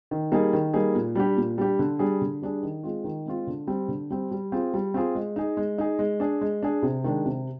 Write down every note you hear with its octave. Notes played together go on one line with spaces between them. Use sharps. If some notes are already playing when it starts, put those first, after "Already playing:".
D#3
G3 A#3 D#4 G#4
D#3
G3 A#3 D#4 G#4
A#2
G3 D4 G4
A#2
G3 D4 G4
D3
G3 D4 G#4
D3
G3 D4 G#4
D#3
G#3 C4 F4
D#3
G#3 C4 F4
D3
G3 C4
D3
G3 C4
G3
C4 F4 G#4
G3
C4 F4 G#4
G#3
D#4 G#4
G#3
D#4 G#4
G#3
D4 G#4
G#3
D4 G#4
C3
D#3 G#3 D4
C3